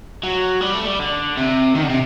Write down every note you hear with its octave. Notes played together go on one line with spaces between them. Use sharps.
F#3
G3
A3
G3
D3
C3
D#3
D3
C3